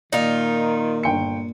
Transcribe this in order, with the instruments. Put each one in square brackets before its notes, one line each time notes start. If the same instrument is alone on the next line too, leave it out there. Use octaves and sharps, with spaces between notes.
[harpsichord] A#2 [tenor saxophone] D#3 [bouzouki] D#4 F4
[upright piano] G1 G5 C#7